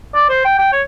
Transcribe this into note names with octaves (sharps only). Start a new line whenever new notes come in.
D5
C5
G5
G5
C#5